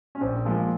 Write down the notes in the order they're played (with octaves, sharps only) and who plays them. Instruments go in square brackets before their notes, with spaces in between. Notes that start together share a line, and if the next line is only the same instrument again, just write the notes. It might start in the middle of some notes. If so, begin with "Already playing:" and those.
[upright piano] C#4
[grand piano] A#1 [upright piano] C4
[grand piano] A#2 F3 G#3 [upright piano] A#3